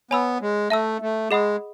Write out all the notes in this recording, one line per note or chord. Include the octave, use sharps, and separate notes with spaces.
B3 C#5 G#5 B5 E6
G#3
A3 E5 A5 E6
A3
G#3 G#4 D#5 F#5 B5 D#6